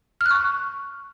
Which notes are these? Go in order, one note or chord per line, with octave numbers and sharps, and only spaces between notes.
F6
F#6
C#6